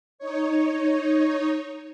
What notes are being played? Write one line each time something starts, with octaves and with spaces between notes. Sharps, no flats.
D#4 C#5